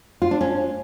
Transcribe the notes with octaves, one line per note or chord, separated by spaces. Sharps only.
F4
D4
C#4